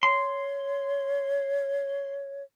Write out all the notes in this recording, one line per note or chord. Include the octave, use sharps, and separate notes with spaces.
C#5 C6